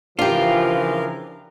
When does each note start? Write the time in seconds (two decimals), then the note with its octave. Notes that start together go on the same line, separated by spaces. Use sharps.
0.19 C#3 E3 F3 D4 F4 G4 A#4